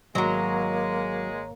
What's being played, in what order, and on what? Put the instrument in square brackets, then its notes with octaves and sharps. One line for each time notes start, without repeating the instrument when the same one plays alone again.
[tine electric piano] G#1 C#5 A#5 [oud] F#3 F#4 [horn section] G#3 [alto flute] A#3